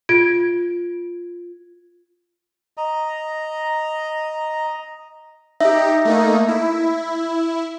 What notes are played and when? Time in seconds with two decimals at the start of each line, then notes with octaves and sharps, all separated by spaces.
0.09 F4 G#6 D7
2.77 D#5 A#5
5.60 D#4 G4 E5
6.05 A3 A#3 D#4
6.49 E4